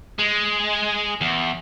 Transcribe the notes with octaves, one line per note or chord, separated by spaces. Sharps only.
G#3
E2